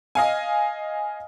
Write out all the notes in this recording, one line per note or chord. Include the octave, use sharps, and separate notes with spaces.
D#5 F5 G#5